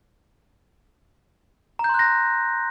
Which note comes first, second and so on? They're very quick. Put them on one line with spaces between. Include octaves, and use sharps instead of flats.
A#5 G6 C6 F#6 A#6